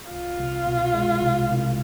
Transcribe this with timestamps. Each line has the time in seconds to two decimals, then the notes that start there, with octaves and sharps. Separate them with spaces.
0.11 C2 F4
0.38 C2
0.66 B2
0.94 G#3
1.21 C2
1.50 C2